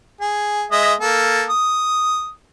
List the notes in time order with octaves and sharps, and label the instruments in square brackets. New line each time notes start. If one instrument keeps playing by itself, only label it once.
[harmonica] G#4
G#3 D#5 E5
A#3 A4
D#6